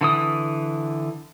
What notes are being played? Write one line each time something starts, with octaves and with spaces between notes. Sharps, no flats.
D3 E3 D#6